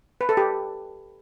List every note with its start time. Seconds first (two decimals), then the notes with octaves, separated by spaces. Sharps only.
0.21 B4
0.29 A4
0.37 G4